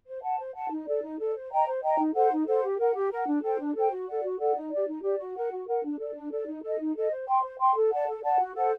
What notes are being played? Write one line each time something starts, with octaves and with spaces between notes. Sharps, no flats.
C5
F#5 A5
C5
F#5 A5
D#4
A4 D5
D#4
A4 D5
C5
D#5 G5 A#5
C5
D#5 G5 A#5
D#4
A4 C5 F#5
D#4
A4 C5 F#5
G4
A#4 F#5
G4
A#4 F#5
D4
A4 C5 G5
D4
A4 C5 G5
F#4
A4 D5 F#5
F#4
A4 D5 F#5
D#4
G4 D5
D#4
G4 D5
F#4
A#4 F#5
F#4
A#4 F#5
D4
A4 D5
D4
A4 D5
D#4
A4 D#5
D#4
A4 D#5
C5
G5 C6
C5
G5 C6
A4
D5 F#5 A5
A4
D5 F#5 A5
F#4
A4 C5 F#5